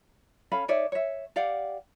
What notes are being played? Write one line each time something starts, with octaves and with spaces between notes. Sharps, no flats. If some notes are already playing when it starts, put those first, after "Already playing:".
C#4 A4 F5 B5
D#4 C#5 D5 E5
C#5 E5
G4 D5 F5 F#5